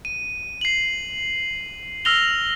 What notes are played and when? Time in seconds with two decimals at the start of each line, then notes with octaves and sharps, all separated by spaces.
0.05 D#7
0.61 C7 F#7
2.05 E6 F6 A#6 F7 G7